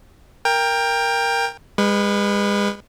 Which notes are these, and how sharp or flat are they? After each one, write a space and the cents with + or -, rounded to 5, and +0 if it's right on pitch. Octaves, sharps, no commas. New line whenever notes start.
A#4 +0 G5 +20
G#3 -35 B4 +0